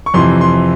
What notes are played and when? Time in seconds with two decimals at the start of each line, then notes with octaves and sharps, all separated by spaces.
0.06 C#6
0.14 F2 C3 E3 C6
0.41 C6